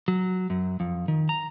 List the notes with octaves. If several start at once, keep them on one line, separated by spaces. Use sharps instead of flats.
F#3
F#2
F2
D#3
A#5